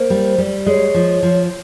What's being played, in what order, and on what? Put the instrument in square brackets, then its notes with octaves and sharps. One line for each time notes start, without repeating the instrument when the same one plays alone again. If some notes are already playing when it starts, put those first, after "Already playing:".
Already playing: [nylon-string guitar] A#3 [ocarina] C5
[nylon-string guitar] G3
G3
[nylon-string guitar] G#3 [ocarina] C#5 D5
[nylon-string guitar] F3
F3